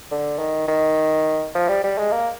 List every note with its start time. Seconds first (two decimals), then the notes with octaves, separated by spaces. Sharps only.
0.11 D3
0.39 D#3
0.68 D#3
1.55 F3
1.68 G3
1.84 G3
1.98 G#3
2.12 A#3